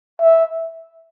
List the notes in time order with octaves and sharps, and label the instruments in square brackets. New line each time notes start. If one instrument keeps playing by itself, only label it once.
[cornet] E5